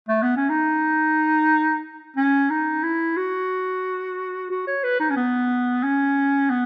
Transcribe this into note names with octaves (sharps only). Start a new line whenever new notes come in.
A3
B3
C#4
D#4
C#4
D#4
E4
F#4
F#4
C#5
B4
D#4
C#4
B3
C#4
B3